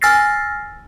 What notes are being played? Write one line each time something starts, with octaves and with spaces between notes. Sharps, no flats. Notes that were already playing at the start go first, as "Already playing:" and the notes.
G#5 E6 F6 A6 A#6 C7